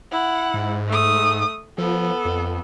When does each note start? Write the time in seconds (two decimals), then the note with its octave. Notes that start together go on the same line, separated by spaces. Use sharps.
0.12 E4 F#5
0.54 G#2
0.88 A3 D#6
1.78 F3 B3 A4
2.25 F2